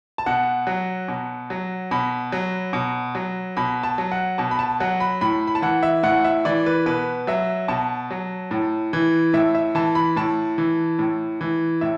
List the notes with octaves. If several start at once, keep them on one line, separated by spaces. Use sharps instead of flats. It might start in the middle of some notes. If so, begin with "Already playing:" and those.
A5
B2 F#5
F#3
B2
F#3
B2 B5
F#3
B2
F#3
B2 B5
A5
F#3
F#5
B2 A5
B5
A5
F#3 F#5
B5
A2 B5
B5
A5
E3 F#5
E5
A2 F#5
E5
E3 D5
B4
B2 B4
F#3 E5
B2 A5
F#3
A2
E3
A2 E5
E5
E3 A5
B5
A2 A5
E3
A2
E3
A2 E5